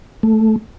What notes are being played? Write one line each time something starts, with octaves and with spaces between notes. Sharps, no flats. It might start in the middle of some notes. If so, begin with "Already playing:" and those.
A3